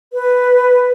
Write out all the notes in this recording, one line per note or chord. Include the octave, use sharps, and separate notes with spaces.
B4